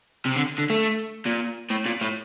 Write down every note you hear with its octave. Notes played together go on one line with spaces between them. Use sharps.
C3
D3
D3
A3
A#2
A2
A#2
A2